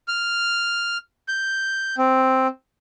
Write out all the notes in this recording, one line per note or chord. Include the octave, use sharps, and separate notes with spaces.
F6
G6
C4